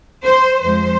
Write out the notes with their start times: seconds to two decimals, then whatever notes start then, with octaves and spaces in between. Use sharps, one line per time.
0.25 C5
0.60 F2 F3 G#3 C5